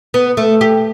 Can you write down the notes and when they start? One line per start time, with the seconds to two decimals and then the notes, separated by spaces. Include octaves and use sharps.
0.14 B3
0.37 A3
0.61 G4